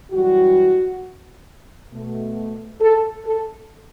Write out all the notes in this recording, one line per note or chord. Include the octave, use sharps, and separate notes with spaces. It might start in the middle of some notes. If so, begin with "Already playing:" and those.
F#2 E3 G3 F#4
B2 A3
A4
A4